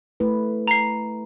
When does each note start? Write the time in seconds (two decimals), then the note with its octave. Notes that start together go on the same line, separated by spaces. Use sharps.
0.20 A3 E4 B4
0.68 A#5 C7